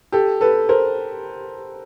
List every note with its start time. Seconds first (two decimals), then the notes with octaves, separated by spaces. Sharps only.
0.12 G4 A4
0.41 A4 B4
0.69 A#4 C5